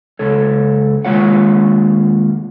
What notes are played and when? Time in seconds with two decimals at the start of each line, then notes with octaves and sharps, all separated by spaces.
0.19 C#2 A4 C#5
1.05 D#2 A#2 G#3 F4 C#5 F#5